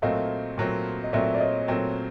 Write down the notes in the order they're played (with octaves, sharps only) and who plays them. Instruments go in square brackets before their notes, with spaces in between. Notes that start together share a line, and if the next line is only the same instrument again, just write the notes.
[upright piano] A#2 F#3 A3 C4 [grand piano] D#5 F5
[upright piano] A#2 F#3 A3 C4
[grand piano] D#5
[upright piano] A#2 F#3 A3 C4 [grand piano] D5 E5
[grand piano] D5
C#5 D#5
[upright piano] A#2 F#3 A3 C4 [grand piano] C#5